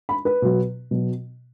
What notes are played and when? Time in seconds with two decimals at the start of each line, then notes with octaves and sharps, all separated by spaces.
0.09 B5
0.25 B4
0.42 B2 F#3
0.91 B2 F#3